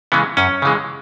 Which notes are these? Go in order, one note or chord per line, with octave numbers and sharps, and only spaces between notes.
C#3 E3 G#3 B3
F#2 C#4
C#3 E3 G#3